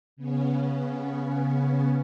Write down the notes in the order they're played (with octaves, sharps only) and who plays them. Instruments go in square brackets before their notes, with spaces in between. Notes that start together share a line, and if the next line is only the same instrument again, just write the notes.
[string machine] C#3 B3 C#4